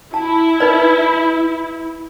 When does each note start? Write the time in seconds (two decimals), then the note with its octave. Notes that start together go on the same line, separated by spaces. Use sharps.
0.14 E4 A5
0.60 D#4 B4 D5